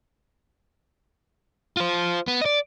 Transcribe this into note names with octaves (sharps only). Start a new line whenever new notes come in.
F4 C5
B3
D5 D#5